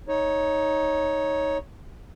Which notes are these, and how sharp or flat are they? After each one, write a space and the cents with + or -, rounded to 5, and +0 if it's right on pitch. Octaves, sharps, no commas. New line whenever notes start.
D#4 +10 C#5 +0